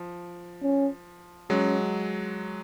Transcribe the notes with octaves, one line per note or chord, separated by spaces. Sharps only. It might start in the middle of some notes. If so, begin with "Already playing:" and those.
Already playing: F3
C#4
F#3 G#3 C#4